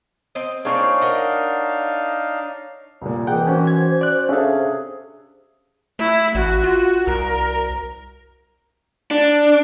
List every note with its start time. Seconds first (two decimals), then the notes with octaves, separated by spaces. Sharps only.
0.35 C4 D#5
0.65 A#3 C4 D4 D#4 G#4 C#5 F5 C#6
1.01 A#4 D#5 F#5
3.02 C2 A#2
3.27 D#3 E3 G#4 F#5 G5
3.47 C#4 F#4 C5
3.67 G#6
4.01 D5 F#6
4.29 C3 C#4 D4 G#4 A4 E5 F5
5.99 A3 E4
6.35 A1 F#4
6.64 F4
7.07 C2 A#4
9.11 D4